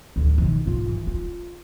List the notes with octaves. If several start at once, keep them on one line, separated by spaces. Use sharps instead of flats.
D1 D2
B2 D#3
G#2 F4
E3
F4